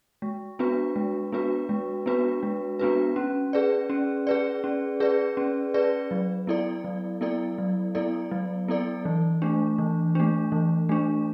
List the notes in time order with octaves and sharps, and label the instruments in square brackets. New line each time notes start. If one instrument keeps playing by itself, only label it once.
[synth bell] G#3
B3 D4 F#4 B4
G#3
B3 D4 F#4 B4
G#3
B3 D4 F#4 B4
G#3
B3 D4 F#4 B4
C#4
G#4 B4 D5
C#4
G#4 B4 D5
C#4
G#4 B4 D5
C#4
G#4 B4 D5
F#3
B3 E4 A4 D5
F#3
B3 E4 A4 D5
F#3
B3 E4 A4 D5
F#3
B3 E4 A4 D5
E3
A3 D4
E3
A3 D4
E3
A3 D4